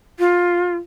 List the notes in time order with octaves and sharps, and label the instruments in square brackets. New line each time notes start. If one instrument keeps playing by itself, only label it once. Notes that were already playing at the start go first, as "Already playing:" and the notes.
[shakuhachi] F4